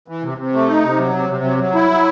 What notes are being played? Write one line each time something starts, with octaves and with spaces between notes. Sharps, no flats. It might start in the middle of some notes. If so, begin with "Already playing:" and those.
E3
C3
C3
A3
D#4
C3
F#3
C3
C3
F#3
F#3
E4
F#3